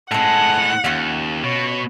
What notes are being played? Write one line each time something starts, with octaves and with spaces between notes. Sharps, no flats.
A2 G#3 C4 A4 F#5
D#2 C#4 F4
B2 C#5